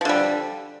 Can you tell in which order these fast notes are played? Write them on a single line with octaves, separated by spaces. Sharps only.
F3 D3 G3